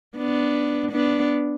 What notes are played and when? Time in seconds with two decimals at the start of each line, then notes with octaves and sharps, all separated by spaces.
0.17 B3 D4
0.91 B3 D4